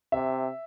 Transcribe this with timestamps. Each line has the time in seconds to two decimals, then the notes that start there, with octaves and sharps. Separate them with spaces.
0.12 C3 E5